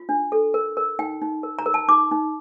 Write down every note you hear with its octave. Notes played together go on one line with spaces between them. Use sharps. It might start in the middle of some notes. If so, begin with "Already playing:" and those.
Already playing: F4
D4
A4
A#4
A#4
D#4 G5
D#4
A#4
A#5
A#4
A5
D#4 D6
D#4